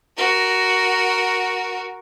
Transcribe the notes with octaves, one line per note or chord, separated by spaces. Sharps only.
F#4 A#4